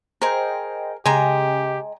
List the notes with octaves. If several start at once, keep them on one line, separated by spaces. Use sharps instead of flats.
G#4 A#4 C5 D#5 G5
C#3 G#3 G4 G5 G#5 A#5